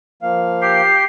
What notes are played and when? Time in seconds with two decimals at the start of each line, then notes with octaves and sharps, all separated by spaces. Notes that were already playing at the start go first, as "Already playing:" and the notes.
0.23 F3 A#3 F5
0.62 G4 C7